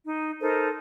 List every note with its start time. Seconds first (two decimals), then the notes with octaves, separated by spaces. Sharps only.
0.04 D#4
0.41 D#4 A4 A#4 C5